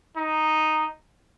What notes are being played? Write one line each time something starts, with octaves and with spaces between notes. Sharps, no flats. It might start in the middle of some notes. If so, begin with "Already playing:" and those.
D#4